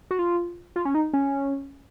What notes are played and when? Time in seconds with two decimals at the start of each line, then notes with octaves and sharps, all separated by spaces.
0.11 F#4
0.19 F4
0.76 F4
0.85 C#4
0.95 D#4
1.13 C#4